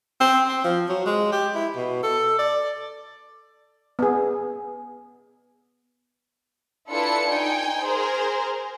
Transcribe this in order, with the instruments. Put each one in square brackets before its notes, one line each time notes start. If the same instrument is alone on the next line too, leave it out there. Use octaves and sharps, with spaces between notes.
[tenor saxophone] C4
C4
F3
F#3
G#3
G4
E4
B2
A4
D5
[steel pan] B3 G#4
[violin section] D4 E4 F4 A4 B4 C#7
D#4 G5 G#5
G#4 A#4 C5